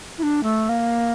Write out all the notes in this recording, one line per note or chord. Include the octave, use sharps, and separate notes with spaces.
E4
D4
A3
A#3